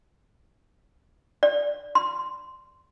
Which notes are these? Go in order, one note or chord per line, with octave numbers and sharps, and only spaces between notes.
D5
C6